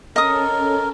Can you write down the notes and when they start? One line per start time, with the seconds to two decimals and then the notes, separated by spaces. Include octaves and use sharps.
0.16 C#4 A4 A#4 D#5 D#6